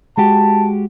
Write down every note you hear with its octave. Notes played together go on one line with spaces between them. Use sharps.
G#3 F#4 G4 A5